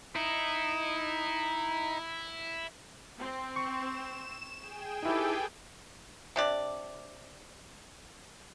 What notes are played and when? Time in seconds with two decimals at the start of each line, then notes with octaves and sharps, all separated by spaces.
0.16 D#4 E4
3.20 C4
3.56 C#6 E7
4.59 G#4 G5 G#5
5.03 D#4 E4 G4 A4 B4
6.36 C3 D4 D5